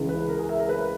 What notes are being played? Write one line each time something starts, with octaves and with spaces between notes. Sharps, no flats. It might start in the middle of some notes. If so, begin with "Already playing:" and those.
Already playing: C#2 C#3 E3
B4
A#4
G#4
E5
A#4
B4